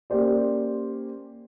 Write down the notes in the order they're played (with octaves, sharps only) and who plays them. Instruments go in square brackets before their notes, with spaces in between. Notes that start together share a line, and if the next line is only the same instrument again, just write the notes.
[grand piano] A#3 C#4 G4 C5 D5